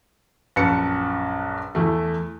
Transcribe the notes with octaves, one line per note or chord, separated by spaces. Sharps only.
A#1 F#2 B4 A5 C#7
E2 A3